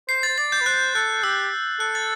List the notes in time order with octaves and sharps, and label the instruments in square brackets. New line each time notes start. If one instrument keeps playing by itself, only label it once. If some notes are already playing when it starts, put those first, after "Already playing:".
[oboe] C5 [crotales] C7
[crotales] A6
[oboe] C5
[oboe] D5 [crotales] A6
[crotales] G6
[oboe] B4
[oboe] C5 [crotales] F#6
[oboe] A4 [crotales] F#6
[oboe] G4 [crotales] E6
[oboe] A4 [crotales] F#6
[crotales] A6